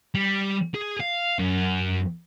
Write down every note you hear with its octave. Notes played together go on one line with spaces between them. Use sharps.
G3
G#4
F5
F#2